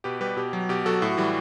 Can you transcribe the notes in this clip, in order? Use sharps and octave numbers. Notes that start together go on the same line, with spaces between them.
B2 G4 B4
G3 G4 B4
B2 G4
F#3
B2 G4
F#3 F#4 A4
A2 F#4
E3 G3